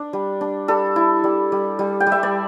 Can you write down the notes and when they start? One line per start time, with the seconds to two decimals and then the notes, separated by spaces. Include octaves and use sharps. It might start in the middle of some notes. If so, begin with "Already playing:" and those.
Already playing: D4
0.13 G3
0.41 D4
0.68 G3 A4
0.96 E4
1.24 G3
1.52 G3
1.79 G3
2.00 G5
2.07 G3
2.12 E5
2.23 D5